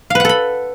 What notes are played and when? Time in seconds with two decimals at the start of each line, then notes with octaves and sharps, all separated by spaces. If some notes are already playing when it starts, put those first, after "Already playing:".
0.10 F5
0.15 B4
0.20 F#5
0.25 A4
0.29 B5